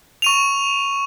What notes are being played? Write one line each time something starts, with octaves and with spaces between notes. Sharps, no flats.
C#6 D#7 F7